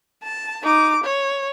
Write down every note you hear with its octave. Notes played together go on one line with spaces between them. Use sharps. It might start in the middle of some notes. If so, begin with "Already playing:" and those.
A5
D#4 D6
C#5